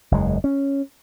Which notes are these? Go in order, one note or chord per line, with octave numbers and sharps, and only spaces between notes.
F#1 E2 G#3
C#4